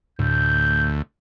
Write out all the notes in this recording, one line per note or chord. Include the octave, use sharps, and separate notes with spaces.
D2 A2 G6